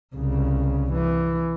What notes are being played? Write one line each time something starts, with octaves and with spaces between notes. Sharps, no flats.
C2 C#3
E3